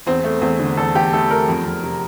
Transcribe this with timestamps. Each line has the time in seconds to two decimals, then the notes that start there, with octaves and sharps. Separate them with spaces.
0.06 E2 C4
0.24 A3
0.41 E2 C4
0.60 D3
0.77 E2 A4
0.95 E2 G4
1.13 A3 A4
1.30 E2 A#4
1.48 F2
1.65 F2
1.83 C3